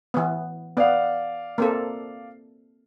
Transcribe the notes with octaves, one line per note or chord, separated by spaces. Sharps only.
E3 B3
B3 D5 F5
A#3 C4 A4